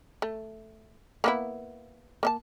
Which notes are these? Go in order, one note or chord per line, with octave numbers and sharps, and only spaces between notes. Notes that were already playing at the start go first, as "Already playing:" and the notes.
A3
A#3 B3 E4
A#3 E5 A5